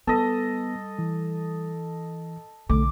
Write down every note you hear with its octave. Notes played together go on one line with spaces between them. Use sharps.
G3 B3 A4 D#5
E3
B1 D3 A3 D6